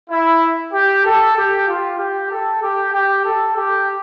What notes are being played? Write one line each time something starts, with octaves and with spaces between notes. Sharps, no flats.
E4
G4
A4
G4
F4
G4
A4
G4
G4
A4
G4